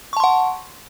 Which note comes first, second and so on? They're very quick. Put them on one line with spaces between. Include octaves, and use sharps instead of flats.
C#6 A5 C6 F#5